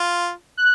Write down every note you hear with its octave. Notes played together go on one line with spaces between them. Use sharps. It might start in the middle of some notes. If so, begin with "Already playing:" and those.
Already playing: F4
F#6